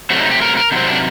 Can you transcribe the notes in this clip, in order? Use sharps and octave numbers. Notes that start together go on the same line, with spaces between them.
C3 F#3 A3 F#4
D4
D#4
G4
A#4
A#4
C3 D#3 F#3 C4
D4